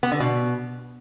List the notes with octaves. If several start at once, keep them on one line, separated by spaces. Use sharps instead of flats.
B3
D3
B2